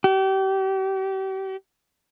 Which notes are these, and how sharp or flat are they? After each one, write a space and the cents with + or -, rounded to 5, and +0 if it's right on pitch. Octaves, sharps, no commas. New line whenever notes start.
G4 -35